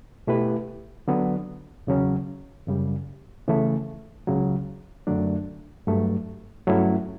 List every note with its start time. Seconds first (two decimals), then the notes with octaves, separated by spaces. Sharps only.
0.27 B2 A3 E4 G4 B4
1.08 D3 F#3 B3
1.87 E2 C#3 F#3 C#4
2.67 F#2 C#3 G3
3.47 C#3 E3 A3
4.27 C#2 C#3 F#3
5.07 F#2 D3 F#3 A3 D4
5.87 G2 F#3 A3
6.67 G2 F#3 A3 C#4 E4